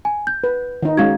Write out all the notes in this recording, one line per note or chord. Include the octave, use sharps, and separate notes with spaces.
G#5
G6
B4
D#3 D#4
G#3 C#4 F#4 F5 C#6 G#6